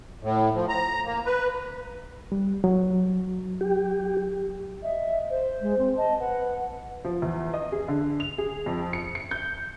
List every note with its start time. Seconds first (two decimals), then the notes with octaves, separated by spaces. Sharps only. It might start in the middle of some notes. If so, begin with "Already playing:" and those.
0.23 A2
0.55 F3
0.69 A#5
1.05 A#3
1.26 B4
2.32 G3
2.64 F#3
3.61 G4
4.83 D#5 E5
5.30 C5
5.61 G#3
5.78 C4
5.97 D#5 A5
6.20 B4 F#5
7.04 F3
7.22 E2
7.54 D#5
7.72 G#4
7.88 D3
8.20 F7
8.38 G#4
8.66 F2
8.93 C#7
9.15 C#7
9.31 G6